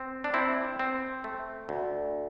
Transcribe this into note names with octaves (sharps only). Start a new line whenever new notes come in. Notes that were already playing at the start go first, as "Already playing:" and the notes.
Already playing: C4
D4
C4 E4
C4
A3
D2